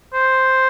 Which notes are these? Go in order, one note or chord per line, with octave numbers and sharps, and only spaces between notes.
C5